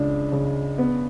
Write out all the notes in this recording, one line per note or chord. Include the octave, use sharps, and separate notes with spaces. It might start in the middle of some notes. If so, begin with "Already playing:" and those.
Already playing: C#2 C#3 D4
C#3
B3